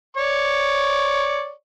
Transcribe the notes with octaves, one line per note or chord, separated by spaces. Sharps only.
C#5 D5 C#6